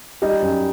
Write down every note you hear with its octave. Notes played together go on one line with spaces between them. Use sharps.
G3 D#4
F#2